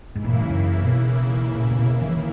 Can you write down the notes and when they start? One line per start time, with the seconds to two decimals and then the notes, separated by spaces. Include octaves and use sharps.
0.15 D#2 G#2 C#3 E3 A#3 E4
0.24 A#2
0.33 G#2
0.50 F#2
0.81 A#2
0.85 B2
1.55 A#2
1.71 A#2
1.79 B2
2.02 D#3
2.09 E3
2.16 D#3